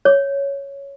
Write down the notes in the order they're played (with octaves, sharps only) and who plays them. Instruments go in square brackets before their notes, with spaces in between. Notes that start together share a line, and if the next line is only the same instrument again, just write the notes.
[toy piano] C#5